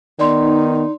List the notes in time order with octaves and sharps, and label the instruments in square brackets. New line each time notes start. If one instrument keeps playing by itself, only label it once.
[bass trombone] D#3 [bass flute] B3 [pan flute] D#4 [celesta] D5 C6